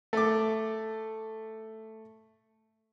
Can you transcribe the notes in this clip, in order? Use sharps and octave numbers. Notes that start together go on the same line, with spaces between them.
A3 D6